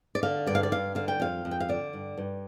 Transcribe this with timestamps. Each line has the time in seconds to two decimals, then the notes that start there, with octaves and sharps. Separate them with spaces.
0.15 D5
0.23 D3 F5
0.47 G2 D5
0.55 F5
0.63 D5
0.72 G2 F5
0.95 D3 F5
1.08 G5
1.20 F2 F5
1.45 F2
1.51 G5
1.60 F5
1.69 D3 D5
1.93 G2
2.17 G2